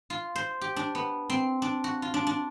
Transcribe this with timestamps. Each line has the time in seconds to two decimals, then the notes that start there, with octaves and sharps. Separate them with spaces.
0.10 F4
0.35 C5
0.61 G4
0.76 D4
0.95 B3
1.30 C4
1.62 D4
1.84 F#4
2.02 F4
2.14 D4
2.27 D4